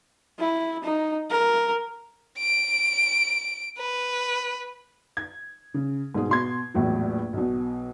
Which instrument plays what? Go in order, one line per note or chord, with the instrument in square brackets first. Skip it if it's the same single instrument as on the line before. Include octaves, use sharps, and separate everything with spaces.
[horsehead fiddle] E4
D#4
A#4
[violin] D7
B4
[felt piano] G#6
C#3
G#2 B2 G#4
B2 C6 G#6
A#1 E2 A2 F#3
B1 B2